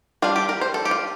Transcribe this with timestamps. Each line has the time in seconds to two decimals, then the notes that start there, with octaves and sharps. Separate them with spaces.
0.22 G3 D4 F4
0.36 G4
0.49 A#4
0.61 C5
0.74 A4
0.85 G4
0.91 F4